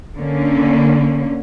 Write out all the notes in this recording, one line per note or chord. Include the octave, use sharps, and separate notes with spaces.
D3 A#3 C#4